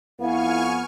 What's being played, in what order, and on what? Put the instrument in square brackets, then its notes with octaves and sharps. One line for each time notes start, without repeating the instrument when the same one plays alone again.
[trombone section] F2 B3 [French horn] E4 [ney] F5 [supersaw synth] G#5 C#6 F6